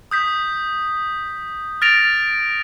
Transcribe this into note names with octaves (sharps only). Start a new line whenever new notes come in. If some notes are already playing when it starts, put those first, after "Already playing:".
D#6 G6 B6
F6 A6 A#6 D7 F7